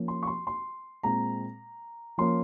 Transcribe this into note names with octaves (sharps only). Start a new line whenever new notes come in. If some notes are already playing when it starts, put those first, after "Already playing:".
Already playing: F3 A#3 C#4
C6
C#6
C6
C6
A#2 G#3 C4 A#5
F3 A#3 C#4 C6